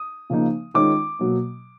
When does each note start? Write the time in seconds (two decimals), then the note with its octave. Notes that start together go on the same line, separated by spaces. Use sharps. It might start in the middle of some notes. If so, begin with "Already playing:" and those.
Already playing: D#6
0.30 C#3 F3 A#3 D#4
0.74 D#3 G#3 C#4 F4 D6
1.19 B2 F#3 A#3